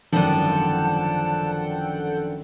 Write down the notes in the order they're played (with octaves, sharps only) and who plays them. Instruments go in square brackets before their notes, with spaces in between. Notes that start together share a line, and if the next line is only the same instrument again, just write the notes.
[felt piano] G#1 F#2 [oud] D3 F3 [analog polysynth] A4 F#5 G5 [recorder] A5